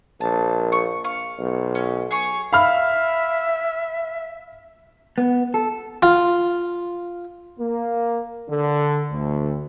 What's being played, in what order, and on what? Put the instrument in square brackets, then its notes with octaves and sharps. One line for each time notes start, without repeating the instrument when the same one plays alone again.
[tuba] A#1 [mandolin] A5
[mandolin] C#6
F5 C#6
[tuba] B1
[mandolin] C#4
G#4 C#5 C#6
[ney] E5 [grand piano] F5 B5 F6
[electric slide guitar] B3
A4
[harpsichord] F4
[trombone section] A#3
D3
D2